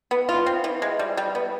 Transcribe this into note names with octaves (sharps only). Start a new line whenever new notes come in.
B3
F4
C4
E3
G#3
G3
G3
B3